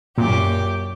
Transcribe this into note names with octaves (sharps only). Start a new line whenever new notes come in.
F#2 A#2 G4 D6